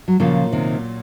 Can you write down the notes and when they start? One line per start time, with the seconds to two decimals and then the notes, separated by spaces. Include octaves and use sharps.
0.08 F#3
0.20 A#2 C#3 F3 F#3 A#3 F4
0.52 C3 D#3